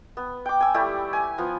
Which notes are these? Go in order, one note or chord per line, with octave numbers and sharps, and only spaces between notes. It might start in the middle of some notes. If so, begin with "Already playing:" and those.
B3
G5 D6
G#5 E6
G3 A3 E4 G4
G#5
F3 B3